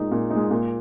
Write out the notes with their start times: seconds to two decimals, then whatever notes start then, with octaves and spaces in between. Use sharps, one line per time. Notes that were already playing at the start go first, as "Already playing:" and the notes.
Already playing: A#2 G#3 D#4
0.11 A#2
0.30 D#4
0.35 G#3
0.50 A#2